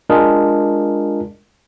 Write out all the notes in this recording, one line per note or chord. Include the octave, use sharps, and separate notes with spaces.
G#3 D4 F4 G#4 A#4